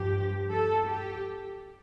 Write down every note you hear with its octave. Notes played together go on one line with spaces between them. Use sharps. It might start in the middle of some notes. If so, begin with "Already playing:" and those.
Already playing: G2 F3 G4
A4
G4